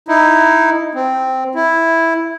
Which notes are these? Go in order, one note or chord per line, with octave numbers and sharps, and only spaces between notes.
D#4 E4
C4
E4